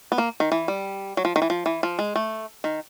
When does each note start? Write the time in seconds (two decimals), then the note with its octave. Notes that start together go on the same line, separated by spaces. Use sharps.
0.12 B3
0.18 A#3
0.40 D#3
0.52 E3
0.68 G3
1.17 F#3
1.25 F3
1.36 D#3
1.42 E3
1.50 F3
1.66 E3
1.83 F3
1.99 G#3
2.16 A3
2.64 D#3